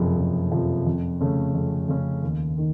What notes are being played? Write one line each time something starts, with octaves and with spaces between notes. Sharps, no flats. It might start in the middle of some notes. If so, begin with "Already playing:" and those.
Already playing: F#1 F2 C3 F3
F#1
F2 C3 F3
F2
C#3 A3 C#4
F2
C#3 A3 C#4
D#2
D#3